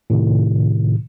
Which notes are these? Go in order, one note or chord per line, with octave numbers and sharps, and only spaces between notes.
A2 C3 D#3